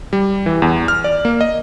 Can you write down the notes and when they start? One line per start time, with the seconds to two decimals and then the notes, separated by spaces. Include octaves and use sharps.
0.13 G3
0.46 E3
0.62 E2
0.88 F6
1.04 D5
1.25 A#3
1.41 D#5